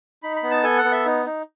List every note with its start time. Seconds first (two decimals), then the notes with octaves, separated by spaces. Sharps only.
0.23 D#4 B5
0.36 B5
0.43 B3
0.51 A5
0.63 A4 G#5
0.78 F#5
0.84 B3
0.92 E5
1.06 D#4
1.26 D#4